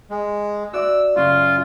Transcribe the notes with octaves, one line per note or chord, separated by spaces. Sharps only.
G#3
F#4 D5 E5 E6
F#2 C#3 F4 C6